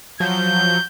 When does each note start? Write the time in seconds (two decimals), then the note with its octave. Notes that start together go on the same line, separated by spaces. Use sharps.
0.20 F3 F#3 G6